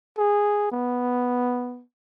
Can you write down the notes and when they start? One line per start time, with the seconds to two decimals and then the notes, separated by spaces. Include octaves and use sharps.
0.18 G#4
0.72 B3